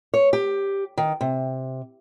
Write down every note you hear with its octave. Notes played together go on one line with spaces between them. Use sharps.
C#5
G4
D#3
C3